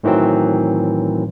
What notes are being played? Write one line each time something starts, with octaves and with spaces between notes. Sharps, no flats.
A2 D#3 E3 F#3 C4